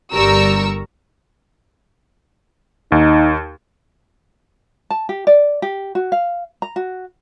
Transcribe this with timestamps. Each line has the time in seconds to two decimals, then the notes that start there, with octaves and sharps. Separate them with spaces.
0.13 G1 G3 A#4 A#5 C#6 E6
2.92 D#2 D#4
4.90 A5
5.09 G4
5.27 D5
5.62 G4
5.95 F#4
6.12 F5
6.62 A#5
6.76 F#4